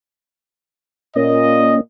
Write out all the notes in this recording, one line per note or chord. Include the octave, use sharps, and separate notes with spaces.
A#2 A#3 C#4 D#5